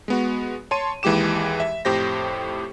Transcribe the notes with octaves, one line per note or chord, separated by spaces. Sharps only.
G#3 B3 F#4
C#5 A5 C6 D#7
D#2 E3 G#3 G4 D6 E7
E5
F2 A2 G4 C5 A#6